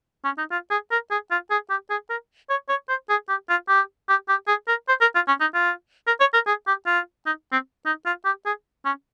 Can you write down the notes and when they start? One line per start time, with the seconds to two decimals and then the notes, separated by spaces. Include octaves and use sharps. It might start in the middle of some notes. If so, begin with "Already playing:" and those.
0.25 C#4
0.38 D#4
0.51 F4
0.71 G#4
0.91 A#4
1.11 G#4
1.31 F4
1.51 G#4
1.70 G4
1.90 G#4
2.10 A#4
2.50 C#5
2.69 C#5
2.89 C5
3.09 G#4
3.29 G4
3.49 F4
3.68 G4
4.09 G4
4.29 G4
4.48 G#4
4.68 A#4
4.89 C5
5.01 A#4
5.15 F4
5.28 C#4
5.41 D#4
5.54 F4
6.07 A#4
6.20 C#5
6.34 A#4
6.47 G#4
6.67 G4
6.87 F4
7.26 D#4
7.52 C4
7.86 D#4
8.06 F4
8.25 G4
8.46 G#4
8.85 C#4